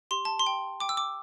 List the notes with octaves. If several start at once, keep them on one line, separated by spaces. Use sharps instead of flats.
G4 C6
A5
C6
G5
G5 D6
E6
D6